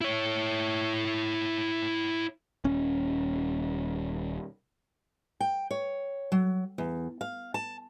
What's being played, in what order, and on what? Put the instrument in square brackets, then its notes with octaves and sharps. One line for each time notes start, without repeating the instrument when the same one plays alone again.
[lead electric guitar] E4 C#5
[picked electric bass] D#1 C#4
[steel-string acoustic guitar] G5
C#5
F#3
E2
F5
A5